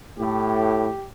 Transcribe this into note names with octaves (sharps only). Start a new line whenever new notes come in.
A2 G4